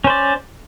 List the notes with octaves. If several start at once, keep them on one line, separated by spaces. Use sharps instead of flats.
C#4 C5 D5